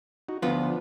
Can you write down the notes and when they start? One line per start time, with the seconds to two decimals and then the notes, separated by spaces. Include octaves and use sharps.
0.29 D#4 F#4
0.42 D2 F3 B3 D4 F4